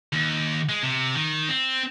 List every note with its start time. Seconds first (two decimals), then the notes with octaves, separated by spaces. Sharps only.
0.13 D#2
0.69 G#3
0.83 C3
1.15 D#3
1.49 C4